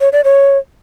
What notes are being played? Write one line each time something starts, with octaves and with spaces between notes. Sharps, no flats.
C#5
D5
C#5